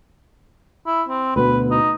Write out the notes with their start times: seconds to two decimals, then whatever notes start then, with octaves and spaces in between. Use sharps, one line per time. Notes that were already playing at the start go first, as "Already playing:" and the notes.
0.87 E4
1.09 C4
1.36 D2 B2 B3 B4
1.71 D#4